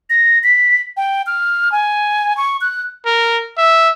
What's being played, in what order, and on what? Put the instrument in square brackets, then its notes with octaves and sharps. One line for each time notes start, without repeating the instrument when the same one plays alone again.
[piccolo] A#6
B6
G5
F6
G#5
C#6
F#6
[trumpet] A#4
E5